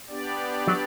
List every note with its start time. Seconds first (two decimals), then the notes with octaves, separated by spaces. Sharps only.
0.08 B3 D4 G4 D5
0.67 F#3